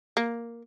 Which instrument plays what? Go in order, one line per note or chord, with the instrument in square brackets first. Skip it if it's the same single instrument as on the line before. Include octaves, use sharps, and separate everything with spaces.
[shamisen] A#3